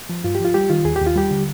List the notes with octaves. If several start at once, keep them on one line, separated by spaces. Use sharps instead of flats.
F3
G2 F4
F3 G4
F4
G3 G4
D#3 F4
D#2 G#4
G4
D#2
F4
G3 G4
D3